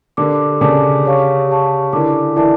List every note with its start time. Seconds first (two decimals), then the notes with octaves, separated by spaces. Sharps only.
0.17 D3 G4 A#4 D5 A5 D6
0.61 C#3 G4 A#4 D5 A5 D6
1.05 G4 C#5 F5 A5 C#6
1.48 G4 C#5 F5 A5 C#6
1.93 D3 E4 A#4 D5 A5 D6
2.36 E3 E4 A#4 D5 A5 D6